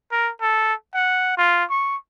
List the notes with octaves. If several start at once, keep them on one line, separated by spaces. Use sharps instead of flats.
A#4
A4
F#5
F4
C#6